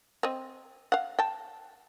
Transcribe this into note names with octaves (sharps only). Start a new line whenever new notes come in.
C4 D#5
F5 F#5
G5 A5